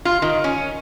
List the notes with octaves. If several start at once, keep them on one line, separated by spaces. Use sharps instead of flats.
F4
D#3
C#4